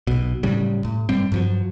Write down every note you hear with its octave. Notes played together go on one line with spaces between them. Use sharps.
B1 B2
F#1 A2 C#3 G3
A2
G2 G3 C4
G2 F3 F#3